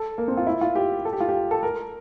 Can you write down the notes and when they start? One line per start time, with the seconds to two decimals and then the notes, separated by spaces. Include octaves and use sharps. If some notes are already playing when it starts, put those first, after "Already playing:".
Already playing: A4
0.18 A#3
0.28 C4
0.37 F4
0.47 E4
0.61 F4
0.75 G4
1.05 A4
1.13 G4
1.20 F4
1.29 G4
1.51 A4
1.63 A#4